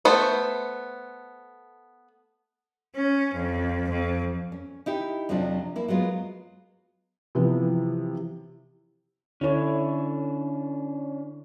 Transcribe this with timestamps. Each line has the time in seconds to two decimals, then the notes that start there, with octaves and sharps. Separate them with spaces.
0.05 A3 B3 C5
2.96 C#4
3.34 F2
3.90 F2
4.52 C#4
4.86 D#4 E4 G4
5.29 F2 C3 F3 F#3 D4
5.76 A#3 E4
5.88 F#3 G#3 B3 F4
7.35 C3 E3 F3 B3
9.41 D3 C#4 D4 E4 C#5